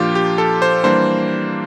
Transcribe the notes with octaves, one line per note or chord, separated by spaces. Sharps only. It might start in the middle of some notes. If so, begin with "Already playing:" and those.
Already playing: A#2 F3 A#3 D4 F4 G4
G4
A4
C5
E3 G3 A#3 D4 C5